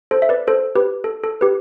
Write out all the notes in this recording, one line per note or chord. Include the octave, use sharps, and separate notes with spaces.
A4 C5
E5
B4 D5
A4 C5
G4 B4
A4
A4
G4 B4